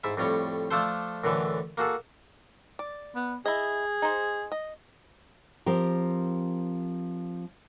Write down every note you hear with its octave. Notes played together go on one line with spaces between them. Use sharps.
G#2 E4 E5
F2 A2 G3 C#5
F3 A3 D4 F4 A4 C5
F#2 A2 D3 E3
A#3 F#4 G#4 A4
D5
B3
E4 G#4 D#5
D#4 C5
D#5
F3 C4 G4 A#4